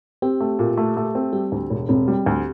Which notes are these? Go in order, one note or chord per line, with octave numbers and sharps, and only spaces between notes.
C4 G4
A3
A#2
A3
A3
C4
G3 G4
D2
E1
E1 C4
G3
D2